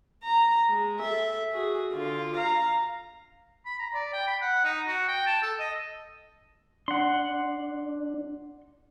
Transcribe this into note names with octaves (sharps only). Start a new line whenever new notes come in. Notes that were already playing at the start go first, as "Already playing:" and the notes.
A#5
G#3
A4 E5
F#4 G#4
D3 F4
F5 A#5
B5
A#5
D5
G5
B5
F#5
D#4
F#4
G5
A5
A4
D#5
D4 F#5 C6